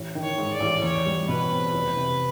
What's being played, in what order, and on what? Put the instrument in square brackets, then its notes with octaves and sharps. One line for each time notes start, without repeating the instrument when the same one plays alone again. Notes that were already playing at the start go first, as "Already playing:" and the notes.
Already playing: [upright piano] A1
D#3
[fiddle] C#5
[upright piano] G#2
[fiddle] D5
[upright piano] A1
[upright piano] E2 [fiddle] C#5
[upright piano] G3
[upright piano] B2 [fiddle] B4
[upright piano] C4
F1
C3